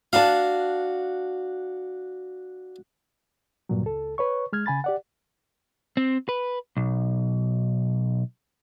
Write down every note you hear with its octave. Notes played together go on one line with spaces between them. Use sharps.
D4 F#4 F5 A5
G2 A#2 F#3
C#2 A4
B4 C#5 C#6
G#3 F6 G#6
C#3 G#5 B5 A6
G4 D5 F#5
C4
B4
B1